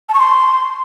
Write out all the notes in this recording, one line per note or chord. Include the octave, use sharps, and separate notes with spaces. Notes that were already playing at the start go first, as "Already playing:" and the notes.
A5
C#6
C6